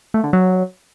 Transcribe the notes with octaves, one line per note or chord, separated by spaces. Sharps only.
A3
D3
F#3